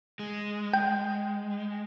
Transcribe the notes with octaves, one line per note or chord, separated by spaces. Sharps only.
G#3
G5